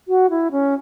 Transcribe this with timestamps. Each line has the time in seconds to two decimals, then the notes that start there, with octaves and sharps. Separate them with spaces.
0.08 F#4
0.30 E4
0.51 C#4